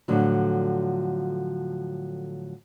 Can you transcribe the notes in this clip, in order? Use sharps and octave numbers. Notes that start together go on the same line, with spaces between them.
A2 D3 F3 F#3